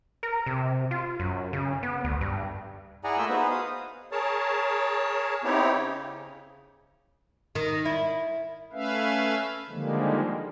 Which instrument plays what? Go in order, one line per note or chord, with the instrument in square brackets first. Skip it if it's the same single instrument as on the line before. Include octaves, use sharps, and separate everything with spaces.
[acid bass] A#4
C3
F4
F#2
C#3
B3
D2
G2
[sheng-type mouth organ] E4 G#4 D5 F#5 G#5 A#5
A3 A#3 F4 E5 E6 G6
B3 D#4 F#4 G#4 B4 C5
F5 D#6
[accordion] G#4 A#4 C#5 A5
B3 C4 D#4 E4 G4 C#5
C#3
[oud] D#3
E4
[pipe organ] A3 C#4 B4 E5 F5
D3 D#3 F3 G3 G#3 A#3